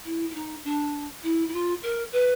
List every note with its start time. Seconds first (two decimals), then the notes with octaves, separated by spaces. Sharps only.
0.05 E4
0.30 E4
0.34 D#4
0.64 D4
1.23 E4
1.48 E4
1.53 F4
1.83 A#4
2.12 B4